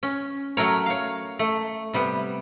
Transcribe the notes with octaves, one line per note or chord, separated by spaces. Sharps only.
C#4
F#3 A3 A#4 C#5
C#5 F5
A3
C3 G3 B3